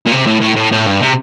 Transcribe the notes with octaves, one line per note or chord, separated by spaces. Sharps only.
A#2
C3
A2
A2
A2
A2
G2
C3